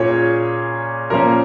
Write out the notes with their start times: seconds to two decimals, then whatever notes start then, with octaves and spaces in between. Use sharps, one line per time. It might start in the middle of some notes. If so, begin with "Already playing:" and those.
Already playing: A#2 A#3 C#4 G#4 C#5
1.10 A#2 F3 A#3 C#4 A#4